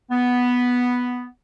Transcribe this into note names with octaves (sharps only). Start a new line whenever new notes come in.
B3